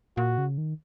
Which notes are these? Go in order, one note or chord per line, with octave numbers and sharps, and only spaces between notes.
A#2 F#4
C#3
D#3